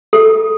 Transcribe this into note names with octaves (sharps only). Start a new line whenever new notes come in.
A4